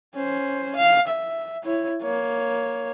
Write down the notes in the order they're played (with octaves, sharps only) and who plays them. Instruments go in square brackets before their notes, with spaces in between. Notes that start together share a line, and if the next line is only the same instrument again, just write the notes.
[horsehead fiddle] C#4 C5
F5
E5
E4 C#5
A#3 C#5